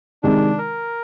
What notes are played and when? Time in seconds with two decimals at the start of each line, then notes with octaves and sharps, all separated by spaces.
0.23 C3 D#3 G#3 D4
0.58 A#4